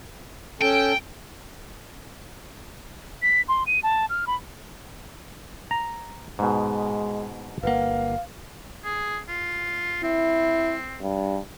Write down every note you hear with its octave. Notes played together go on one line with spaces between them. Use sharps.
C#4 A4 G5 A5
B6
C6
D#7
A5
F6
B5
A#5
G#2 B2 G#3
G1 A#3 B4 F5 F#5
G#4
F4
C4 E4
G2